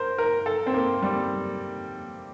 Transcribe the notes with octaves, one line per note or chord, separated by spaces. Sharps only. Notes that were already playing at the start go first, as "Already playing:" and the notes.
Already playing: A#4 C5
A#4
A4
C4
A#3
G3